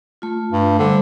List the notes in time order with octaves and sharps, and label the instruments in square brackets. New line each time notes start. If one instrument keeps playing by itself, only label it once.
[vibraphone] A3 F4
[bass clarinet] G2
[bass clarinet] D3 [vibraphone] G3 C5